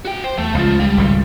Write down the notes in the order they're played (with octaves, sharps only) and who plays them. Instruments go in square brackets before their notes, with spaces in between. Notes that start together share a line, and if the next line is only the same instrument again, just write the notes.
[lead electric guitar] F#4 G5
C5
[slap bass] E2 [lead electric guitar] A3
[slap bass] C#2 [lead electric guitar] F3 F4
[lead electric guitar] G3
[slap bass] G#1 C#2 A2